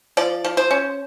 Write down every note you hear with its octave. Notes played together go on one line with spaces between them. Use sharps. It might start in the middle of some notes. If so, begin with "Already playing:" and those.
F3 D5
F3
C5
C#4